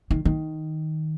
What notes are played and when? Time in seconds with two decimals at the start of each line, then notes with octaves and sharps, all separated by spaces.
0.11 D#3
0.25 D#3